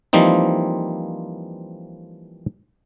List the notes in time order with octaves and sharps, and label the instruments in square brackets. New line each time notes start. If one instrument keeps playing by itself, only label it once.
[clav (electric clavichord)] E3 F3 G3 A#3 C4 D#4